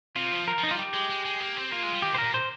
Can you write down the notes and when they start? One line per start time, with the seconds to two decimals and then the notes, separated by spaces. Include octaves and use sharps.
0.16 C3 F4
0.32 F3
0.48 A#4
0.58 F3
0.63 D#4
0.68 G3 F4
0.79 G4
0.94 G#3
1.10 G#3
1.25 G#3
1.40 A#3
1.57 C4
1.71 A#3 F4
1.83 G#3
1.93 G3
2.02 D#3 G4
2.13 A#2 C5
2.18 A#4
2.24 A#2
2.34 C5